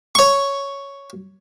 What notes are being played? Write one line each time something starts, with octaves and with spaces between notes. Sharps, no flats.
C#5 C#6